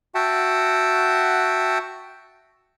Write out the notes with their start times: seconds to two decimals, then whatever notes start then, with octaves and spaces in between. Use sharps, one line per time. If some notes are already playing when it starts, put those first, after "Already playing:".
0.15 F#4 E5 F#5 G5 A5